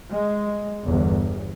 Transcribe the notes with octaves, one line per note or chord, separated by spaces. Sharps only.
G#3
G1 E2